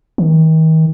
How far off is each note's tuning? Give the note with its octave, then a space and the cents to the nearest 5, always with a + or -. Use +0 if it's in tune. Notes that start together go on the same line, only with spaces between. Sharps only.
D#3 +40